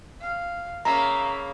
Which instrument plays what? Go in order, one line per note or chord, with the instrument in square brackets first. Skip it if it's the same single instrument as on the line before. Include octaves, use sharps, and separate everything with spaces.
[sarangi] F5
[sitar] C#3 A#3 [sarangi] E5 [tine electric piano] A#5